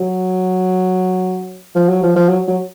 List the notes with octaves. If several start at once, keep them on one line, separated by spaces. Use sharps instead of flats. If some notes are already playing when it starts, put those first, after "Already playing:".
Already playing: F#3
F3
F#3
F3
F3
F#3
F#3